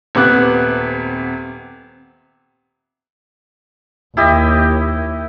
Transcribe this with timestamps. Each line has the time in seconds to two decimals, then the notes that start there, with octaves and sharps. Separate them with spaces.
0.15 D#1 C3 B3 D6 F#6
4.17 D#2 E4 G4 D#5